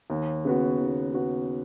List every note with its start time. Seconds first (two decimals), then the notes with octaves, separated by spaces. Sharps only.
0.10 D#2
0.45 C#3 B3 F#4
0.80 D#2
1.14 C#3 B3 F#4